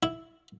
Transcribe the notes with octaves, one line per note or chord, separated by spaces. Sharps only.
E4